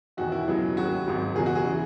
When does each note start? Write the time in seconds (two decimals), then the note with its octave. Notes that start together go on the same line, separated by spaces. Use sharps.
0.17 E1 E2 D#3 F#4
0.32 E4
0.48 C#2 B2 F#3
0.77 D#2 C#3 F#3 F#4
1.06 G#1 G#2 F#3
1.35 F#1 E2 B2 G#4
1.46 F#4
1.55 G#4
1.65 C#3 E3